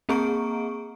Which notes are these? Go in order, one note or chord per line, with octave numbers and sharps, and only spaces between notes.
A#3 C4 G#4 A#5 C#6 D7